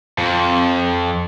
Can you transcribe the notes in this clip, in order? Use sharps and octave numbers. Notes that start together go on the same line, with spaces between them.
F2